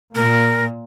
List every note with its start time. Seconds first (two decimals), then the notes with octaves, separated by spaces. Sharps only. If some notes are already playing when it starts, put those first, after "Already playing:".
0.15 A#2 A#4